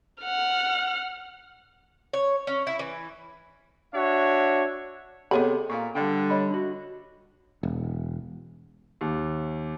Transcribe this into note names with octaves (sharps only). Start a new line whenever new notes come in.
F#5 F6
C#5
C#4
E4
E3
D4 F#4 C#5 E5
C3 B3 G#4 A4 C#5 D#5 B5
A#2 F5 A#5 C#6
D3 G3 D5 G5
C#5 D#5 B5
D4 F#4
E1
D#2